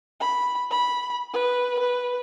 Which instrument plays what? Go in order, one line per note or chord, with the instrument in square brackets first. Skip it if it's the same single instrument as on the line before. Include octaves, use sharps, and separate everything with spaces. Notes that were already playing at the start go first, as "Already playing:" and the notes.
[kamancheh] B5
B5
B4
B4